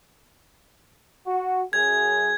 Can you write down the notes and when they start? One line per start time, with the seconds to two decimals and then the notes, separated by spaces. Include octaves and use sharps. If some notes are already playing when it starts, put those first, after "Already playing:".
1.26 F#4
1.73 F#2 G#4 G#6